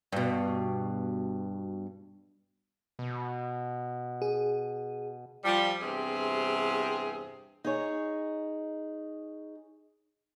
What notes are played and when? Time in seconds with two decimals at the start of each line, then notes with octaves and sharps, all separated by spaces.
0.12 G2 B2
2.99 B2
4.22 G#4
5.45 F3 G3
5.81 E2 G2 C3 C4 G#4
7.64 D#4 G#4 C#5